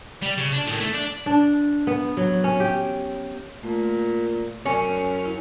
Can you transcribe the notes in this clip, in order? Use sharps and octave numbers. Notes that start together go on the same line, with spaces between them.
G3
C#3
D4
A2 D#3
A3
D4
D4
B3
F#3
C#4
G4
A#2 A3
F#2 C#4
E4